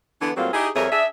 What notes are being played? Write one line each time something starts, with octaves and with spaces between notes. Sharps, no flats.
D3 E3 B3 D4
A2 F#3 G3 A#3 C4 F4
D#4 E4 G4 G#4
F2 G3 G#4 A#4 C#5 E5
D4 G#4 E5